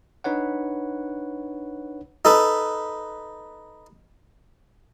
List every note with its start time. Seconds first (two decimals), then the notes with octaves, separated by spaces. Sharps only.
0.24 D4 D#4 B4 C#5 F#5
2.25 D#4 A4 B4